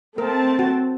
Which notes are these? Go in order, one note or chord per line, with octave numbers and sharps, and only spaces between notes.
A3 C4 A#4 A5
F#4